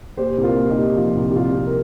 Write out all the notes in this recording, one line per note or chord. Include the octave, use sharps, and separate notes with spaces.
A#2 G4 C5
C2
F4 A#4
A#2
D#4 G4
A#2
F3 F4
C2
G4
C2 F4
C2
A#4